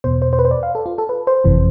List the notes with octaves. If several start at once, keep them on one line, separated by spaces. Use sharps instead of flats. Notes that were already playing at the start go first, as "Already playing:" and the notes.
E2 B2 C5
C5
C5
B4
C5
D5
F5
A4
F4
A4
B4
C5
G1 F2 C3 E3